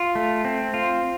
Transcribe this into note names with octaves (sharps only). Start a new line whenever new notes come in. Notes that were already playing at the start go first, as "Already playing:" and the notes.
Already playing: F4
A3
C4
F4